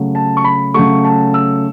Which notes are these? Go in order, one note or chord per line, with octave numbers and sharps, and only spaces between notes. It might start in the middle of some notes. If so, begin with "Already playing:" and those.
Already playing: C#3 F#3 A3
A5
C#6
B5
C#3 F#3 A3 C#6
A5
E6